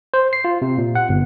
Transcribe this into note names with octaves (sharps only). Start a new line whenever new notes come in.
C5
C7
F4
C3
A#2
F#5
G1